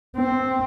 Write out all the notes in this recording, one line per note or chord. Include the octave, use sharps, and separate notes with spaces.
C4